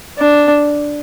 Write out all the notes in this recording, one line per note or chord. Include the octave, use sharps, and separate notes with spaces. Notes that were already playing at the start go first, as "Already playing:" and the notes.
D4